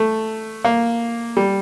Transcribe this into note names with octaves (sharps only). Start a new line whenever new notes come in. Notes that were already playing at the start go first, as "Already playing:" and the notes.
Already playing: A3
A#3
G3